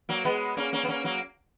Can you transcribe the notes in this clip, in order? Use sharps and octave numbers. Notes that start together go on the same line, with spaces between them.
F#3 A#3
G#3 B3
A#3 C#4
A#3 C#4
B3
A#3 C#4
F#3 A#3